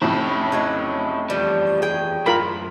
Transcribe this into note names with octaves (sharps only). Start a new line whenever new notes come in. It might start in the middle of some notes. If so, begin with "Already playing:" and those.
F1 F2 A2 C#4 E4
C#3 F#3 D#4
E2 F3 G3
G#4 G5
F#2 A2 F4 A#4 B5